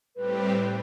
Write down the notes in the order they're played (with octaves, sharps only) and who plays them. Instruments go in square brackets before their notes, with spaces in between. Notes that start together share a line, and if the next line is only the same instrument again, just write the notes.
[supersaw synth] A2 G3 C4 G4 [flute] B4